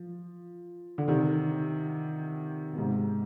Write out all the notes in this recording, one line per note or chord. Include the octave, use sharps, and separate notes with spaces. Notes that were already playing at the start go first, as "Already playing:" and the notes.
Already playing: F3
D3
C3 D#3
B2
G#2 C3